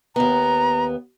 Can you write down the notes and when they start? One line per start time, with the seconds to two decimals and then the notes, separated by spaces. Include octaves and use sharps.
0.16 D#2 B3 A#5